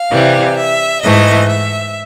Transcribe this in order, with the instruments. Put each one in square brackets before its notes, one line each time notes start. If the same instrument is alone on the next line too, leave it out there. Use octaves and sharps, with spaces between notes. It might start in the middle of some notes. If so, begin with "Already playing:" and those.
Already playing: [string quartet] F5
C3 E3 G3
E5
G#2 E3 A3 D#5
E5